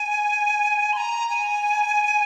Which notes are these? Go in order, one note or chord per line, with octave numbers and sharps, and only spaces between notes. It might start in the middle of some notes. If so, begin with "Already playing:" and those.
Already playing: G#5
C6
A#5
G#5